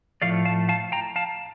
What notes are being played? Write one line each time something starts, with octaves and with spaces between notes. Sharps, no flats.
A2 F3 A3 D5 F5
F5 A5
F5 A5
G5 A#5
F5 A5